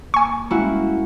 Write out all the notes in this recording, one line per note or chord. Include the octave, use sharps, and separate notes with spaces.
A#3 G#5 C#6
G3 G#3 A#3 C#4 E4 F#4